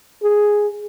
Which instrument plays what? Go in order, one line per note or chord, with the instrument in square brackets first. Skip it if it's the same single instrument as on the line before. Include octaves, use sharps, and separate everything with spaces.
[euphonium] G#4